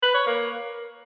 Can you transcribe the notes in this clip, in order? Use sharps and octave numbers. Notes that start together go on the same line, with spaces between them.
B4
C#5
A#3